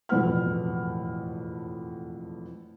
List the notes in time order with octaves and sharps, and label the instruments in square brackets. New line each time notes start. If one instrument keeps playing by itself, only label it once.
[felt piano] E1 F2 A2 B4 F#5 F6